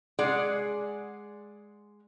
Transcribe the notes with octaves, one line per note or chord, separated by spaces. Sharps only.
G#3 G#4 D5 F#5